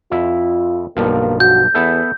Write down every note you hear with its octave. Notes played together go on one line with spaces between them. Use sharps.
F2 E4 F4
B1 G2 F3 A#3
F#4 G6
E2 B3 E4 A4